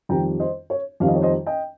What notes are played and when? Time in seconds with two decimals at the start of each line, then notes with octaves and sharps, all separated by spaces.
0.09 F2 D#3 G3 G5 A#5
0.40 C5 D#5
0.70 C#5
1.00 F2 D#3 G3 F5
1.08 D#5
1.15 C#5
1.22 C5 D#5
1.46 D#5 G5